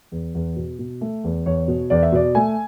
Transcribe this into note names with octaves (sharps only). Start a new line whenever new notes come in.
E2
E2
B2
B2
A3
E2
E2 C#5
B2
E2 D5
E5
B2 D5
A3 G#5